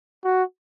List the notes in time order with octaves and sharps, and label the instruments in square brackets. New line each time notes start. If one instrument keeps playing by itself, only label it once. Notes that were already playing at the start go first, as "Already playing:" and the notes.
[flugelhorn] F#4